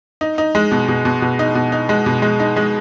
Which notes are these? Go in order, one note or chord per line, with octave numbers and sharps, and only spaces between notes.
D#4
D#4
G#3
B2
B2
B2
B2
D#4
B2
D#4
G#3
B2
G#3
D#4
G#3